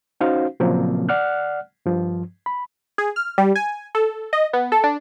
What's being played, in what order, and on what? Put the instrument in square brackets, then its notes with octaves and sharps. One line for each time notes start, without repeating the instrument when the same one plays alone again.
[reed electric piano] C#4 D#4 F#4 C5 F5
A#2 C#3 F3 F#3 A#3 C4
D5 F#5 F6 F#6
G2 F3
B5
[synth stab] G#4
F6
G3
G#5
A4
D#5
B3
A4
D4